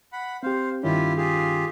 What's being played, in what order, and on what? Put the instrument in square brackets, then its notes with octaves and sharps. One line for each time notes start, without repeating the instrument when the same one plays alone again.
[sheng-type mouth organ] F#5 B5
[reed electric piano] C4 G4 [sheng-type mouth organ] C5 F5
[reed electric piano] G2 D#3 C#4 [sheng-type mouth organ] E4 F4 G4
[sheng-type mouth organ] F4 G4 G#4